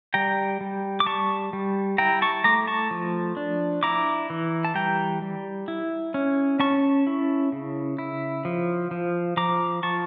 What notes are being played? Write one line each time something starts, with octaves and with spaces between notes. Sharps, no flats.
G3 G5 A#5
G3
D6
G3 A5 C#6
G3
E4 G5 A#5
A5 C#6
A3 A#5 D6
A5 C#6
F3
D4
E4 A#5 D6
E3
A5
G3 G5 A#5
G3
E4
C#4
C#4 A5 C#6
E4
C#3
E4
F3
F3
F3 A#5 D6
F3 A5 C#6